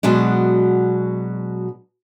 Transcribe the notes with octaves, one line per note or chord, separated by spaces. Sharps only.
B2 F#3 G#3 D4